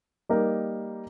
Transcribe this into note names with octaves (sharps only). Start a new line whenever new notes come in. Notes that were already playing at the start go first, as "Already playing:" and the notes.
G3 A#3 D#4 A#4